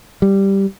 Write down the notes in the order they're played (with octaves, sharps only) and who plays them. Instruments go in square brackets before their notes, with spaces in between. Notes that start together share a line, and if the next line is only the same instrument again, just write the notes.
[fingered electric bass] G3